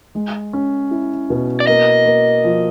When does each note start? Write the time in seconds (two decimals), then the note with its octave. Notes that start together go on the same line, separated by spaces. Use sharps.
0.15 G#3
0.53 C#4
0.91 E4
1.30 B2
1.60 D5
1.67 A#3 D#5
2.06 A#3
2.44 F3